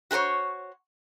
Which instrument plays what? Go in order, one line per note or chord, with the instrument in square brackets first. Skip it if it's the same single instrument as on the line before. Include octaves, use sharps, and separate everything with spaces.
[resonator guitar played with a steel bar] F#4 G4 A#4 C5 C#5